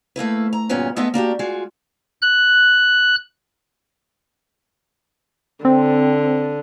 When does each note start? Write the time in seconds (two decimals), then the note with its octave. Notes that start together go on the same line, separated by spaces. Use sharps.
0.16 A3 A#3 E4 B4
0.53 A#5
0.69 D2 G2 A#2 B3 C#4 B4
0.96 G#3 A3 B3 B4 D#5 E5
1.14 A#3 D4 F#4 G4
1.39 G#3 F4 F#4
2.22 F#6
5.65 D3 C4